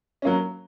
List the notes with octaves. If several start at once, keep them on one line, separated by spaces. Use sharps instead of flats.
F#3 A#3 C#4